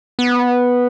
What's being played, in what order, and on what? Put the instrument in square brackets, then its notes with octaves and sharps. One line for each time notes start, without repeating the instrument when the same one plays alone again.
[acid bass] B3